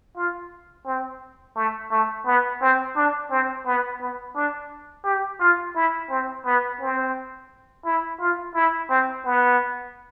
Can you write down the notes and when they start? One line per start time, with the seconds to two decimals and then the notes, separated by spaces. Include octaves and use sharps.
0.16 F4
0.86 C4
1.56 A3
1.91 A3
2.26 B3
2.61 C4
2.96 D4
3.31 C4
3.66 B3
4.01 B3
4.36 D4
5.05 G4
5.40 F4
5.76 E4
6.10 C4
6.46 B3
6.81 C4
7.85 E4
8.20 F4
8.55 E4
8.89 C4
9.26 B3